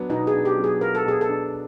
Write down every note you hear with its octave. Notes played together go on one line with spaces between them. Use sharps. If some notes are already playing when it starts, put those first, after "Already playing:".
Already playing: F#3 B3 D4
B2 D#4
G#4
D4
G4
F#3
G#4
B3 A#4
A4
B2 G#4
A4
D4